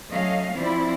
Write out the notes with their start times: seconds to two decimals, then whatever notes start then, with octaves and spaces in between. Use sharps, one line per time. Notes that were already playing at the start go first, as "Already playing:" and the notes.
0.11 F#3 A3 C#4 D#5 F5
0.55 F3 C4 E4 D5